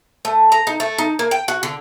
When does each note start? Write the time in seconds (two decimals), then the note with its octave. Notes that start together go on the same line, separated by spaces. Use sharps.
0.25 A3
0.52 A#5
0.67 D#4
0.80 A3
0.98 D#4
1.19 A#3
1.31 G5
1.48 F#4
1.63 D3